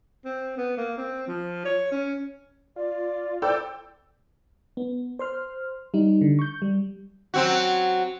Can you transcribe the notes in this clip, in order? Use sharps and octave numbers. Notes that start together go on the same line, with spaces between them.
C4
B3
A#3
C4
F3
C#5
C#4
F4 D5
E4 A4 C5 D5 G5 E6
B3
C5 C6 F6
G3 D#4
D3
C#6 G6
G3
F#3 C4 F#4